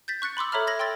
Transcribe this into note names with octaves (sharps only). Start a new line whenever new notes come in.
G6 A6 B6
C#6 F#6 A6 C#7
B5 C6 D6 E6
A4 C#5 E5 A#5 B5 F6
G#6 A#6 F#7
G5 C6 E6 A6